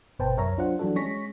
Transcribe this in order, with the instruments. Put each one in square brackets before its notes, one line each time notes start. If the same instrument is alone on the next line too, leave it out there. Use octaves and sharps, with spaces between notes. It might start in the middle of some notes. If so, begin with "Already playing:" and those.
[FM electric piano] G1 B2 B4 C5 G5 A5
C2 F#2 A#4 C#5 E5 A#5
F#3 D4 F4 C5 F#5
E3 F#3 G3 D4 F#4 A4
G#3 C#4 C#6 A#6 B6